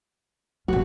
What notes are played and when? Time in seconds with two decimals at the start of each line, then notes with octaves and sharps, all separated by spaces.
0.68 A1 F3 F#4